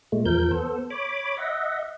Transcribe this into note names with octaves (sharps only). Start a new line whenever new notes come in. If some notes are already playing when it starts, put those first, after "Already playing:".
A#2 G#3 A3
E2 F3 A#4 G6
B3 A4 C5
C#5 B5 D6
D#5 E5 F#5